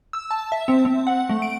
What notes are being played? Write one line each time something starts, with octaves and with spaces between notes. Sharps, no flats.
E6
A5
E5
C4
C4
F#5
A3
D7